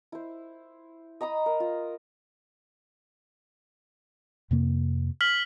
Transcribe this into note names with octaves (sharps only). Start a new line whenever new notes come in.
E4 C5
D#5 A#5 B5 D#6
A#4
F4
F2 C3 A#3
F6 B6 F#7